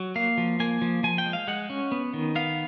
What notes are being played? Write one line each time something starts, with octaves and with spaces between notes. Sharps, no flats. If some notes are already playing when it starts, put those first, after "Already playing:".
Already playing: F#3
A#3 F5
F3
A#3 G#5
F3
F3 G#5
G5
G#3
F5
G#3 F#5
C#4
B3
D#3
B3 F5